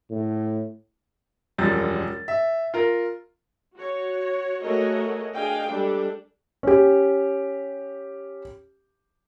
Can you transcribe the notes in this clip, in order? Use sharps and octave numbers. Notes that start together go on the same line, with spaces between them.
A2
E1 F#2 F3 G3 A6
E5
F4 A#4
F#4 C#5
A3 F#4 G#4 A#4 C#5 D#5
D4 G#4 D#5 F5 G5
G3 G#3 D4 G4 A4
C#4 G4